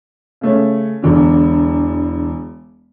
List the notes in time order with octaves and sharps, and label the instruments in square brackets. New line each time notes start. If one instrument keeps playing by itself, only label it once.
[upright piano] C#3 A3 C#4
E1 E2 D3